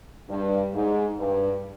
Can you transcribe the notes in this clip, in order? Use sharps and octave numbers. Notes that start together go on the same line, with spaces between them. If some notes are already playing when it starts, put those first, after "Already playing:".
G2
G#2
G2